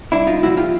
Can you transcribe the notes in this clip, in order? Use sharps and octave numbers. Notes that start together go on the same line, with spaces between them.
C2 D4 E4
D#4 F4
A#2 F3 E4 F#4
F4 G4